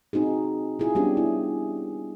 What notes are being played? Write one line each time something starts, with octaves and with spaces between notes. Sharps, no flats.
C4 D#4 F#4 G#4
E4 F4 G#4
G3 B3 C#4 D4 G4
E4